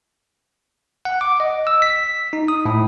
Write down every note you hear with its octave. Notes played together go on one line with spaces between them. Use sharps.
F#5
D6
D#5
E6
B6
D#4
D#6
A2